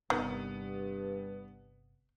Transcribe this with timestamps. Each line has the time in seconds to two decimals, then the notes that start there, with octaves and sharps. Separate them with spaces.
0.10 G1 G2 C3 D#3 B3